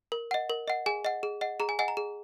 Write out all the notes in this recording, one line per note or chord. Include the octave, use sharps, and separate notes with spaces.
A#4
D#5 F#5
A#4
D#5 F#5
G#4 G#5
D#5 F#5
G#4
D#5 F#5
G#4 A#5
G#5
D#5 F#5 G#5
A#5
G#4